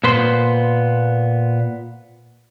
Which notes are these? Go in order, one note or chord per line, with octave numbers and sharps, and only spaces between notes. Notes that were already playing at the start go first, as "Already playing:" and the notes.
A#2 B3 B4 C5 C6